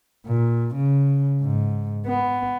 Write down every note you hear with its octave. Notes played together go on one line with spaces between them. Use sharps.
A#2
C#3
G#2
B3